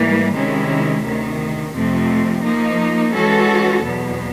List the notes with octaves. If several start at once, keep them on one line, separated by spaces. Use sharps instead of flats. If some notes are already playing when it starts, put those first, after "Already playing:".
Already playing: G#2 E3 G3 A#3
C3 D#3 G#3 C#4 E4
D2 C3 D#3
F2 C3 F3 A3 C4
F3 A#3 D#4
E3 G#3 C#4 F#4 A4
E2 B2 F#3 B3